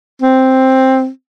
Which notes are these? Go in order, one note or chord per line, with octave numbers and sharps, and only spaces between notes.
C4